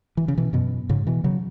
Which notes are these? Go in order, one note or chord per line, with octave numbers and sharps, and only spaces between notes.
E3
C#3
B2 E3
F#2 B2
G#2 C#3
B2 E3
C#3 F#3